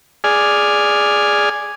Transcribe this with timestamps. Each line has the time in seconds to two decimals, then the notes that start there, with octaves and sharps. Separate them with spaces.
0.24 G#4 D5 G#5 F6